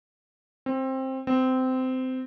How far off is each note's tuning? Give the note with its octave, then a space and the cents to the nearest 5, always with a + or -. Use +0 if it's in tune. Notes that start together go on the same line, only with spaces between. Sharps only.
C4 +15
C4 -20